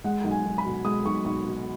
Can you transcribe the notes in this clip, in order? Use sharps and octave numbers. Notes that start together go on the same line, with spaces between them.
G#3 F#5
B1
G#5
B1
B5
B2
G#3 D#6
B1 C#6
B1 C#6
B2